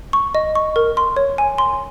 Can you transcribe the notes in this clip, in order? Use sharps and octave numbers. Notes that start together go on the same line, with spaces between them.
C#6
D#5
C#6
A#4
C6
C#5
G#5
C6